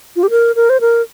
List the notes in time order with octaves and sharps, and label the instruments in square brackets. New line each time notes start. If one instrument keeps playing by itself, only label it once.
[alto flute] F4
G4
A#4
A#4
C5
A#4